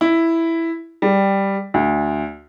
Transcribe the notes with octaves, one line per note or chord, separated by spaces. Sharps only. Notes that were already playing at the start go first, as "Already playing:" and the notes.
E4
G3
D2